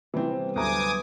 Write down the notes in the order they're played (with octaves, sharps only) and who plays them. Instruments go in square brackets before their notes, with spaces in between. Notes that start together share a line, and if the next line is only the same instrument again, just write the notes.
[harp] C3 G3 B3 [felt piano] E3 C4
[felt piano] D2 A#5 [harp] F#3 B3 [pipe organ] G#5 D6 D#6